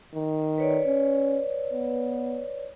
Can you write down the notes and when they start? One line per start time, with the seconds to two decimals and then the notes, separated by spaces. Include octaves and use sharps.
0.15 D#3
0.58 B4 C#5 D5
0.86 C#4
1.73 B3